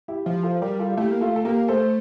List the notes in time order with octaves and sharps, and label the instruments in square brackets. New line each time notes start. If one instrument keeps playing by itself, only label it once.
[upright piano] E4 G4
[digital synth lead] F3 [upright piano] E4 G4
[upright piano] F4 A4
[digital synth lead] G3 [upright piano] G4 A#4
[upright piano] F4 A4
F4
[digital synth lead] A3 [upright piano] E4 G4
[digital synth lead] A#3
[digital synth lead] A3 [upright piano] F4 A4
[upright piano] A4
[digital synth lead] A#3 [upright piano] G4 A#4
[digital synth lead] A3 [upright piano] A4 C5